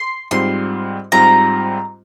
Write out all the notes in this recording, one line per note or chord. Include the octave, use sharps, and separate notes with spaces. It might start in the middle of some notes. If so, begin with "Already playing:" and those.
Already playing: C6
G#2 G3 C4 F4 C6
G#2 G3 C4 F4 A#5